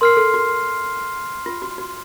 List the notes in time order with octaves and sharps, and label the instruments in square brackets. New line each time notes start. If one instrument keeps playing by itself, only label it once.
[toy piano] A#4 [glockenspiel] C6 F6 C7
[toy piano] A4
F#4
F4
F#4
F#4